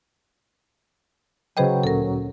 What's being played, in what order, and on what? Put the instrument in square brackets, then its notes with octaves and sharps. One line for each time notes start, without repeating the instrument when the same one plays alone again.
[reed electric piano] C#3 B4 G5 [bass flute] F#3 [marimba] G#4 C5 D#5
[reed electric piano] D2 A#2 C#4 [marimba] A4 A#4